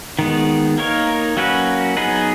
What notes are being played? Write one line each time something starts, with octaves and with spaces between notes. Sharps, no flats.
D#3 G#3 B3
A#3 D#4 A#4 C#5
F#3 A#3 C#4 F#4 B4
F#3 B3 D#4 G#4 B4